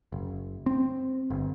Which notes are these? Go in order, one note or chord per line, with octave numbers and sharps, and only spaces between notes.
F#1
C4
G1